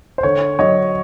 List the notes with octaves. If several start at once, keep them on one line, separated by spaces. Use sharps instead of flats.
C5
D3 C#5
F#3 C#5 D#5